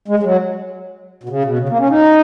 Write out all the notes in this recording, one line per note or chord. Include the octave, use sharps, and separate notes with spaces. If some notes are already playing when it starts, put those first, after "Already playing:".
G#3
G#3
F#3
B2
C#3
B2
C#3
A#3
C#4
D#4